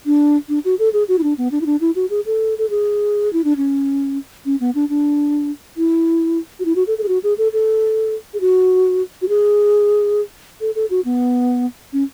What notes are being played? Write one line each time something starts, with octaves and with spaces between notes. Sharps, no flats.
D4
D4
F#4
A4
G#4
F#4
E4
D4
B3
D4
E4
D4
E4
F#4
G#4
A4
A4
G#4
E4
D4
C#4
C#4
B3
D4
D4
E4
F#4
E4
F#4
A4
A4
G#4
F#4
G#4
A4
A4
G#4
F#4
F#4
G#4
A4
A4
F#4
B3
C#4